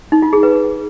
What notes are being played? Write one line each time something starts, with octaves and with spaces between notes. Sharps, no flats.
D#4
F4
G#4
B4